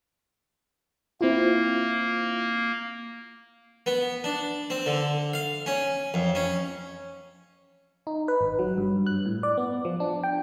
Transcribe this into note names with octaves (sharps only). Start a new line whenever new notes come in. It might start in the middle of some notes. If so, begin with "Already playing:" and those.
A#3 C4 E4 F4
B3
D4
C4
D3
F5
C#4
F2
C#4
D#4
B4
G#1
F#3
G2
F#6
A2
D5
B3
F3
D4
G5